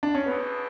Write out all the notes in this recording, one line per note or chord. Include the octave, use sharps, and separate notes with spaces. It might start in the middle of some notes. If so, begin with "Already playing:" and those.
D4
C#4
E2 B2 A3 B3